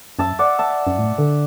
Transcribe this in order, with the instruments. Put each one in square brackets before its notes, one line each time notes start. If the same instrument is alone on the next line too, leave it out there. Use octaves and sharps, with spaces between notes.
[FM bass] F#2 [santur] E5 A5
[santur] D5 F#5
E5 A5
[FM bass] F#2
A2
D3